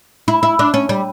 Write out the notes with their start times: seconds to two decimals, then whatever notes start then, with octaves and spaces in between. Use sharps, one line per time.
0.28 E4
0.43 E4
0.59 D4
0.74 C#4
0.89 G3